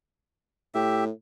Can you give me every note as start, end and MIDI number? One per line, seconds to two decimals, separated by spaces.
0.75 1.10 45
0.75 1.04 67
0.75 1.04 76